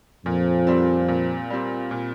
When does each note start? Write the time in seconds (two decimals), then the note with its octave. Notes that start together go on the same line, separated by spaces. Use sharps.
0.25 F2 A#2 F3
0.67 G3 C4
1.08 A#2
1.50 G3 C4
1.91 A#2